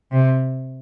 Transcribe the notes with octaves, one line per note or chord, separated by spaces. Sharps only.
C3